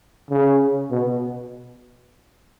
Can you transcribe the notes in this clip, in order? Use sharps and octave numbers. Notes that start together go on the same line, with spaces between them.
C#3
B2